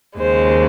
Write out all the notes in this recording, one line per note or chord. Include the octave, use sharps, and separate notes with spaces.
D#2 C#3 G#3 C5